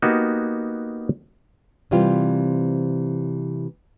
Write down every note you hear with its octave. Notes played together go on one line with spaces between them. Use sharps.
A#3 B3 D#4 F#4 G4
C3 E3 G3 C4 F4